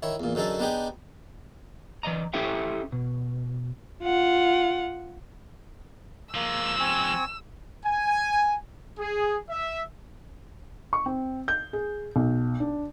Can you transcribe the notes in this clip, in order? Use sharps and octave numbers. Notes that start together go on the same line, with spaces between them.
D#3 E4 C#5
E2 A#2
F#2 D3 D#4 G#4 A4
B3 D4 D#4 G4 G#4
E3 D5 D#5 A#5
C#4 E4 G4 A4 E5 G5
B2
F4 F#5
F3 G#3 A#3 E6
C4 G#5 C#6
G#5
G#4
E5
C#6
C4
G6
G#4
B1
D4